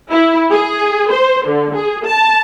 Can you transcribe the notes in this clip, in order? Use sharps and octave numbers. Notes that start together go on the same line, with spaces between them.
E4
G#4
C5
D3
G#4
A5